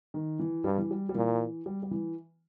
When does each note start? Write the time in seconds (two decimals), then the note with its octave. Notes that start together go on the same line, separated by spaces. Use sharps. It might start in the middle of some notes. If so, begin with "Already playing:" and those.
0.14 D#3
0.40 E3
0.64 G2 G3
0.78 E3
0.91 G3
1.09 G3
1.14 A#2 E3
1.66 G3
1.83 G3
1.91 E3